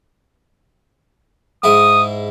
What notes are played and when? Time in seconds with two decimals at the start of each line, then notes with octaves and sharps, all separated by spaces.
1.64 G#2 E4 D#6